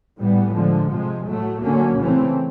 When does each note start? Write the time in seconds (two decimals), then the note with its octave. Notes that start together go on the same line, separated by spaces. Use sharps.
0.19 A2 E3 G3 B3
0.55 D3 F3 G#3
0.91 C3 F3 G#3
1.27 A2 F#3 A3
1.63 D3 F#3 A#3 C#4
1.99 C#3 E3 A3 C4